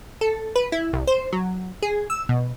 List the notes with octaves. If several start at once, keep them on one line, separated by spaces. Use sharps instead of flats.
A4
B4
E4
C2
C5
F#3
G#4
E6
B2